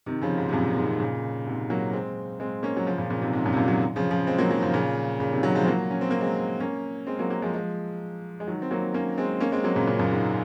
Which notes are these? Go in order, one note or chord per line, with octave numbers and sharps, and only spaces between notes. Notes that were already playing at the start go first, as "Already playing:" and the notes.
C3 D#3
C#3 F3
G#2
C3
F#2 A#2
G#2 C3
A#2 C#3
G#2 C3
F#3 A#3
G#3 C4
G#3 C4
A#3 C#4
F#3
C#3 F3
A#2 C#3
A#2 C#3
G#2 C3
G#2 C3
F#2 A#2
C3
F#2 A#2
D#3 F#3
C#3 F3
C#3 F3
G#3 C4
F#3 A#3
D#3 F#3
C#3 F3
A#2 C#3
A#2 C#3
C3 D#3
D#3 F#3
F3 G#3
C4
F#3 A#3
C#4
C4
A#3
G#3 C4
A#3 C#4
G#3 C4
F#3 A#3
F#3 A#3
F3 G#3
F3 G#3
G#3
D#3 F#3
C4
F#3 A#3
A#3 C#4
G#3 C4
A#3 C#4
G#3 C4
F#3 A#3
A#2 C#3
A#2 C#3
F#2 A#2
G#2